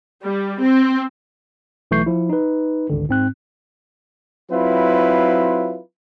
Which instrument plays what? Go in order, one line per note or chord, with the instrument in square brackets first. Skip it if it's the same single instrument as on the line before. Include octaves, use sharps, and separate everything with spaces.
[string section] G3
C4
[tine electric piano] B1 E3 A3 C#6 G6 C7
F3 E4
D#4 B4
G#1 C#2 D3
G#2 C4 F#6
[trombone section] F#3 C4 E4 F4 B4